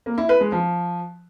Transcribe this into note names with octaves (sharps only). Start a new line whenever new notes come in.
A#3
E4
B4
G#3
F3